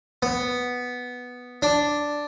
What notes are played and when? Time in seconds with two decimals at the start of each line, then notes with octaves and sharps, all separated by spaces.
0.23 B3
1.62 D4